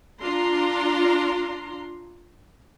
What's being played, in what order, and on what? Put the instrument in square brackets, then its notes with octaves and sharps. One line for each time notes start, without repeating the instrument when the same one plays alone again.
[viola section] D4 F4 A#5 C6